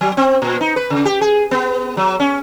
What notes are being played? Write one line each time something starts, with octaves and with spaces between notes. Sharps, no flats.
F#3
C4
A#2
D#4
B4
C#3
G4
G#4
B3
F#3
C#4